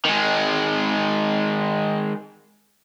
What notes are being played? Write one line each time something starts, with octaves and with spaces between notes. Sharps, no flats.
D#3 G#3